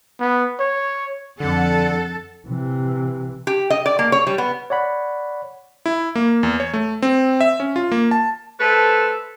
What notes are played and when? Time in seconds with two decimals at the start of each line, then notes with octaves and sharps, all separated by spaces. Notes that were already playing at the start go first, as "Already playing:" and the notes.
0.20 B3
0.60 C#5
1.40 F2 D3 A4 F#5
2.47 C3 E3
3.47 G4
3.70 D#5
3.86 D5
3.99 A#3
4.12 C#5
4.27 G3
4.38 B3
4.70 C#5 D5 F#5 B5
5.86 E4
6.15 A#3
6.43 E2
6.60 C#5
6.74 A3
7.02 C4
7.41 E5
7.60 C#4
7.76 F4
7.92 A#3
8.11 A5
8.60 A3 A4 B4 C5